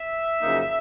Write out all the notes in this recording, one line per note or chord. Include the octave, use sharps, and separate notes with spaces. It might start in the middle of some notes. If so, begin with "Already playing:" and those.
Already playing: E5
F#2 C#3 F3 A#3 D#4